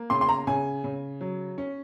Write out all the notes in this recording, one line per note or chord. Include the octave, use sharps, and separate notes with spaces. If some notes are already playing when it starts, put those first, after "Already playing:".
Already playing: A#3
C#3 C6
C6
A#5
C#3 G#5
C#3
F#3
C#4